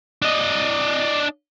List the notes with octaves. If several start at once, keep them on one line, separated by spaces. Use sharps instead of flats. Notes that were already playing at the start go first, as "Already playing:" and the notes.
D4 D#5